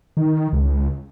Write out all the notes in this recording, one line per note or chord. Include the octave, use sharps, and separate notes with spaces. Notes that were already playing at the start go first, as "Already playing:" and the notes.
D#3
C#2